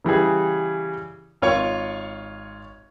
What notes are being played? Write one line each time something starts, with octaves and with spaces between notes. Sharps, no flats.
C#3 E3 G3 G#4
G#1 F4 C#5 C#6